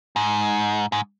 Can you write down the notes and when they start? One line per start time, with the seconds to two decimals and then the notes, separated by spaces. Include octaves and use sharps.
0.16 G#2
0.92 G#2